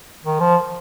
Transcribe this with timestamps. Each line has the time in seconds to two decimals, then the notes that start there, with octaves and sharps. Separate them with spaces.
0.25 D#3
0.40 F3